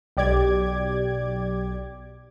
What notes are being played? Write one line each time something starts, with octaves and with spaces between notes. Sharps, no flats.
B1 G4 D5 D6 G#6